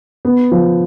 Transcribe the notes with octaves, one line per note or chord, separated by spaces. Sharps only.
B3
F3